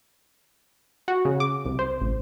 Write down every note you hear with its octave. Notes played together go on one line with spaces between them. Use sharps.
F#4
C#3
D6
C2
C5
A1